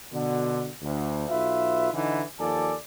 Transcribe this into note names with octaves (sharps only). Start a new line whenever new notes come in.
B2 D3
D2
B1 F4 B4 E5
D3 E3 D#4
D#2 F3 A4 D5 G#5 A5